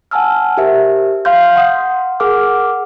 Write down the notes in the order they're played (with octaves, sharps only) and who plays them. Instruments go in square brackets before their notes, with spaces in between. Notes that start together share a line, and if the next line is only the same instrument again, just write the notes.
[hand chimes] F#5 G#5 A5 E6 F6
G4 A#4 C5 E5
F5 C6 F6 G6
F#5 C6 D#6
G#4 A#4 F#5 D6 F6